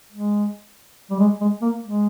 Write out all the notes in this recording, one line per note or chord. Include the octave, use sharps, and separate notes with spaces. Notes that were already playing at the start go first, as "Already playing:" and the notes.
G#3
G3
G#3
G#3
A#3
G#3